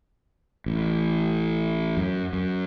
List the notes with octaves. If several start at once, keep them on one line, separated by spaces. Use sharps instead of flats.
A1
F#2
F#2